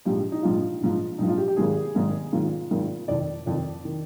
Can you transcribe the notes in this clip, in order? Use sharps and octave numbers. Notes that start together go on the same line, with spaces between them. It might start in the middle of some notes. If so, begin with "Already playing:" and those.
A#1 G#2 F3 G4
D#4
A#1 G#2 F3 F4
A#1 G#2 F3
A#1 G#2 F3 D#4
F4
G4
G4
G#1 G#2 D#3 G#4
G#1 G#2 D#3
G#1 G#2 D#3 F4
G#1 G#2 D#3
F1 F2 D#3 D5
F1 F2 D#3
D#3